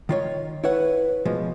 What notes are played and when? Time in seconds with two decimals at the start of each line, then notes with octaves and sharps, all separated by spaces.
0.09 D#3 F4 C#5
0.64 E4 B4 C#5 F#5
1.25 B2 F3 G#3